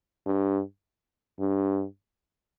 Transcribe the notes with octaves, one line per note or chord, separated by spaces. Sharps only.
G2
G2